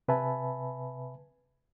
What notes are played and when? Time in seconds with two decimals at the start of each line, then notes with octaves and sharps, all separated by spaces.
0.08 C3 B4 E5 G#5 A5 B5